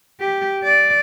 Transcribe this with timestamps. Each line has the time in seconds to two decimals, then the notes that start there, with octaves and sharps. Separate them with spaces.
0.20 G4
0.63 D5